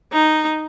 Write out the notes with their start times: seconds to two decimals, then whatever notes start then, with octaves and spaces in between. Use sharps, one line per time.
0.13 D#4